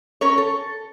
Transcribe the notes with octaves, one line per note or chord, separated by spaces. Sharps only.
C#4 A#4 C#5
A4